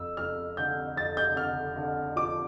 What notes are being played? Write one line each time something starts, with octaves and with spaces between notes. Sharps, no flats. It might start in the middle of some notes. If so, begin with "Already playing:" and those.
Already playing: F2 E6
F2 F6
D3 G6
F2 A6
G6
D3 F6
D3
F3 D6